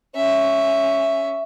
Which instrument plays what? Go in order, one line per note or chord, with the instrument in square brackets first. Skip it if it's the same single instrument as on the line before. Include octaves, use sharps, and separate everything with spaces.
[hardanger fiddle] C#4 E5